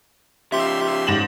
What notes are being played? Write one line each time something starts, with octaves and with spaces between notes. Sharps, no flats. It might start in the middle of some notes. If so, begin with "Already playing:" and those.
C#3 F3 G4 E5 C6
G#2 E7 F#7